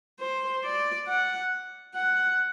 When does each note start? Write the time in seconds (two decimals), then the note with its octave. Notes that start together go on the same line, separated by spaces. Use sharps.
0.20 C5
0.64 D5
1.08 F#5
1.95 F#5